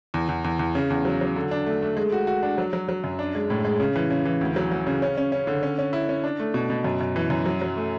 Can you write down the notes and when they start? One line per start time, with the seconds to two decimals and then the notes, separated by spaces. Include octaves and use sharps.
0.14 E2
0.29 E2
0.44 E2
0.59 E2
0.75 C#3
0.90 E2
1.05 F#3
1.21 F#3
1.36 D3
1.51 D4
1.66 A3
1.82 A3
1.97 G#3
2.12 F#4
2.27 F#4
2.43 D4
2.58 F#3
2.73 F#3
2.89 F#3
3.04 F#2
3.19 D4
3.35 G#3
3.50 A2
3.65 G#3
3.80 C#3
3.96 E3
4.11 C#3
4.25 E3
4.41 D2
4.56 F#3
4.71 F#3
4.87 C#3
5.02 C#4
5.18 C#4
5.32 C#4
5.47 D3
5.63 C#4
5.79 C#4
5.93 E4
6.09 C#4
6.24 D4
6.40 A3
6.54 B2
6.70 B2
6.84 F#2
7.01 F#2
7.16 E3
7.30 F#2
7.46 F#3
7.62 F#3
7.76 A3